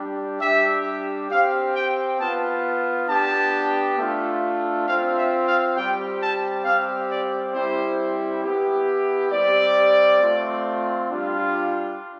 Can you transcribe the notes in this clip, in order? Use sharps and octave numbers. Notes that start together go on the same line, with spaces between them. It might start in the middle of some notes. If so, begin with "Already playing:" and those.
Already playing: G3 D4 G4
G3 D4 G4 E5
C4 G4 F5
G5
B3 F4 A5
B3 D4 G4 A5
A3 D4 F4
C4 F4 F5
E5
F5
G3 C4 G4 G5
A5
G3 C4 G4 F5
D5
G3 C4 E4 G4 C5
B3 E4 G4
G3 C4 G4 D5
A3 C4 F4
G3 D4 F4